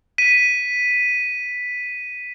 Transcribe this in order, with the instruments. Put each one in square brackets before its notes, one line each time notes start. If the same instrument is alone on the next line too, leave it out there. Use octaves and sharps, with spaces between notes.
[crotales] B6 D#7